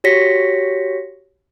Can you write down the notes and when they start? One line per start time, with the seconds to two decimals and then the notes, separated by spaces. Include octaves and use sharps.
0.04 F#4 G4 C#5 A#6 B6 C#7